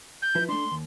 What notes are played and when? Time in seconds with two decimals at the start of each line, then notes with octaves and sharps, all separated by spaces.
0.22 G6
0.35 F3 E4 B4
0.49 A3 D4 C6
0.72 D#2